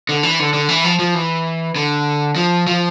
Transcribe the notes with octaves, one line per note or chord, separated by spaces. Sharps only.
D3
E3
D3
D3
E3
F3
F3
E3
D3
F3
F3